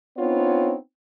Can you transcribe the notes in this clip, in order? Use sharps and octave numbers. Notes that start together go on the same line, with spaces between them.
B3 C4 D4 D#4 F4 C#5